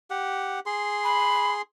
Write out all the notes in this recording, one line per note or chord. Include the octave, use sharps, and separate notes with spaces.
G4 F#5
G#4 C6
B5